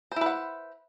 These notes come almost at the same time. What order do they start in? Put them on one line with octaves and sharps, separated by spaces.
C5 E4 B4 F#5